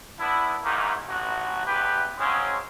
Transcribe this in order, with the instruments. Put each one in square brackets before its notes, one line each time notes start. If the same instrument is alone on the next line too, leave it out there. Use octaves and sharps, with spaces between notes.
[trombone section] B3 D4 E4
E2 G#2 D#3 E3 A#3
A1 F#4
A1 E2 G4 B4
C#3 F#3 G#3 C4 C#4